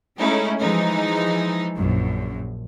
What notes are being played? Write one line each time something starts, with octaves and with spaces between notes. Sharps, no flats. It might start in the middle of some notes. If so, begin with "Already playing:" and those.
G#3 A3 C#4 D#4 E4
E3 F3 G#3 D#4
A#1 F#2